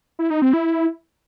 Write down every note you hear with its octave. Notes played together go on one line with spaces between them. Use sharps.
E4
D#4
C4
E4